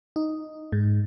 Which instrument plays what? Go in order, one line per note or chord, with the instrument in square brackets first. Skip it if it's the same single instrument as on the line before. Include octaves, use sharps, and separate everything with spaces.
[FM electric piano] D#4
G#2